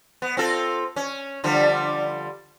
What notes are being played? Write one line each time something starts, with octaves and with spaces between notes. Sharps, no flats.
B3
C4 F4 A4
C#4
D3 F3 G3